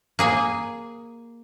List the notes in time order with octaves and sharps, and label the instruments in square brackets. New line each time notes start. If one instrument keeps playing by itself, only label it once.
[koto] A#3 G#4 G#5